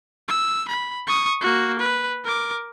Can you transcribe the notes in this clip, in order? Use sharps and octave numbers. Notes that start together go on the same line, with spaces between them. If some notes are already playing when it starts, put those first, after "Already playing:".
E6
B5
C#6 D#6
A#3 F#4
B4
A#4 D6